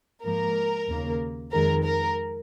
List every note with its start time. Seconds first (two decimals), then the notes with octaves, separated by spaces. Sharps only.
0.23 G#2 F3 A#3 A#4
0.88 D#2 C#3 A#3
1.51 F2 D#3 G#3 A#4
1.84 A#4